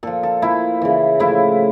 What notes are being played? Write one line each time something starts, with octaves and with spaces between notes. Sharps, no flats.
A#2 F3 A4
A4
A#2 F3 E4
C#3 E3
A2 F3 E4